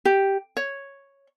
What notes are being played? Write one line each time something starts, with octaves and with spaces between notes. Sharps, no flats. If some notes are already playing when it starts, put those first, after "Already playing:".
G4
C#5